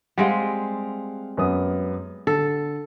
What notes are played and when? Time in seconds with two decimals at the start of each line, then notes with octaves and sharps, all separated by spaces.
0.18 G3 G#3 C4 F5 F#5
1.37 F#2 B3 D#6
2.27 D3 A4